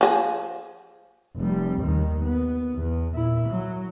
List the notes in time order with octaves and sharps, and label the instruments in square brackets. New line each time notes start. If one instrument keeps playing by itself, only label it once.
[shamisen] F3 F4 G#4
[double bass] F1 G3
D#2 D#3
B3
E2
A#2 E4
F#3